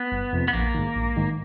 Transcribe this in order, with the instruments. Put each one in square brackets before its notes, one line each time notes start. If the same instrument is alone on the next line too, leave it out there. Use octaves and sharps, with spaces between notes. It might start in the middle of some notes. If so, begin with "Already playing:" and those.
Already playing: [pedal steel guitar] B3
[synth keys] G1
F2 C3
[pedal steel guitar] B3
[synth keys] A#1 [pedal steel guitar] A#3
[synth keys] G#2 D#3
A#1
G#2 D#3